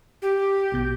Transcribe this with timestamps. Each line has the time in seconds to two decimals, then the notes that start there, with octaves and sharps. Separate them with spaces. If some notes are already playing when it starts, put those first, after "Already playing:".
0.22 G4
0.72 A#1 B2 G6